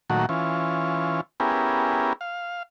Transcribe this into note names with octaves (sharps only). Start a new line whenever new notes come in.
A#2 D#3 F#3 A3 F#4
E3 C#4 F4
B3 C#4 E4 G4 G#4 A#4
F5